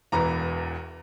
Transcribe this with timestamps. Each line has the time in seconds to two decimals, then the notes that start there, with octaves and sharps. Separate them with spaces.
0.12 E1 E2 E3 A#5